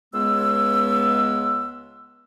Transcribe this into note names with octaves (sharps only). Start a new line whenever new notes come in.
C#2 G#3 B3 E6